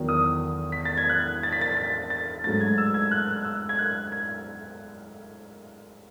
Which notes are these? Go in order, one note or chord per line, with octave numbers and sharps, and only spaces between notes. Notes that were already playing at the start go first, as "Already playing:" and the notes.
Already playing: E2 D#3 F#3
D#6
B6
A6
G#6
F#6
A6
B6
A6
A6
A6
G#2 F#3 A3 A6
G#6
E6
G#6
F#6
F#6
E6
G#6
F#6
G#6